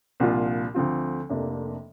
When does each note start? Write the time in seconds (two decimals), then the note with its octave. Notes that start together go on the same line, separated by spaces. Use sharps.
0.20 C2 A#2 F3 D4 F4
0.74 D2 D3 F3 C4 F4
1.30 F1 F2 C3 A#3 D4